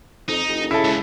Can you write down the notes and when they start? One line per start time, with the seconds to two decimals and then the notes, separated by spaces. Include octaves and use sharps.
0.28 F2 D#4
0.48 F#1
0.71 C#3 E4 A4
0.84 C#2